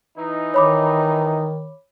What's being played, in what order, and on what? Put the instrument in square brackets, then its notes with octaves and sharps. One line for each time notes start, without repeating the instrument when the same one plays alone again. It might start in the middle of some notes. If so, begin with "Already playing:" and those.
[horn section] E3 D#4
[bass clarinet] D#3 [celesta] C#5 B5 D6